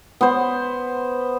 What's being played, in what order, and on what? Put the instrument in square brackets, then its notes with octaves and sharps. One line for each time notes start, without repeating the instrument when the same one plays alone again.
[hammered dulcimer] B3 C5